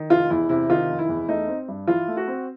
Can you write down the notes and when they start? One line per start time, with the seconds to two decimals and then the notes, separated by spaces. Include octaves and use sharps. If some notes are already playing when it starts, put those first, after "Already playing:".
Already playing: D#3
0.10 F1 F4
0.30 E2 E4
0.49 C3 E4
0.70 D#3 F4
0.89 F1
0.99 E4
1.09 E2
1.28 A3 D#4
1.48 C4
1.68 G2
1.87 E3 F4
2.08 A3
2.17 F#4
2.28 C4